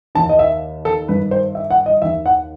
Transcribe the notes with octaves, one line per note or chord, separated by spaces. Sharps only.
D#2 D#3 A5
D#5
E5
A4
G2 D#3 B4
C5
E5
F#5
D#5
D#2 D#3 E5
F#5